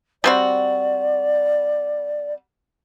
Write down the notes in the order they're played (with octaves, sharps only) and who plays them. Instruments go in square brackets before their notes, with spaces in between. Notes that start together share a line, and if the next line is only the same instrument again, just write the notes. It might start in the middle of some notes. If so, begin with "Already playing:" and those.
[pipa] G3 C4 F#4 [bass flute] D5